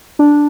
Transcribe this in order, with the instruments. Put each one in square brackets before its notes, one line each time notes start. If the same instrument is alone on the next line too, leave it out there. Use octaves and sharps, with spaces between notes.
[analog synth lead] D4